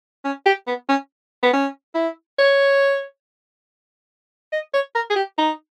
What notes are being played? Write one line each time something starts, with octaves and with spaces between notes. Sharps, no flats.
C#4
G4
B3
C#4
B3
C#4
E4
C#5
D#5
C#5
A#4
G#4
G4
D#4